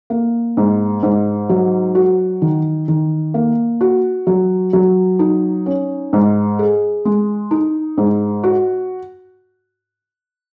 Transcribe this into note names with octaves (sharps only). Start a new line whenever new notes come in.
A#3
G#2
G#2
F#3
F#4
D#3
D#3
A#3
F#4
F#3
F#3
D#4
C#4
G#2
G#4
G#3
D#4
G#2
F#4